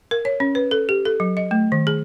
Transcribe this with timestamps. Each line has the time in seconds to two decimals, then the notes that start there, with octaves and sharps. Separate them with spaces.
0.11 A#4
0.25 C#5
0.40 C#4
0.55 B4
0.71 A4
0.89 G4
1.05 A4
1.20 F#3
1.37 D#5
1.51 A3
1.72 D#3
1.87 G#4